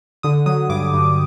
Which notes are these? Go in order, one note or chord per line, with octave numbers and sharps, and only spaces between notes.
D3 D#6
F#3 D#6
G2 D6
G2